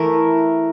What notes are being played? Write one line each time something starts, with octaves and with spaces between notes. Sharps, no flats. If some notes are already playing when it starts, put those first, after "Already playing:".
Already playing: E3 A3 A#4